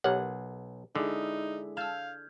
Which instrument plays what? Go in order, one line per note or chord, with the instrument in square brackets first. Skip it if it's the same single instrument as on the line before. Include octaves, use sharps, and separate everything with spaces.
[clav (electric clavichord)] B1 F#5 [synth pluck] G4 A#4 C#5
[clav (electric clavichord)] D3 [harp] G#3 E4 [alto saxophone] D#4
[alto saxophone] F5 [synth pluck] A5 E6 [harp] F6 G6 G#6